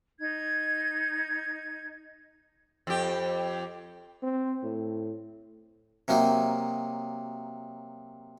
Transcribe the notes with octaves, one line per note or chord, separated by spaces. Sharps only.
D#4 G#6
F2 G4
C4
A2
C3 F#3 A#3 D#4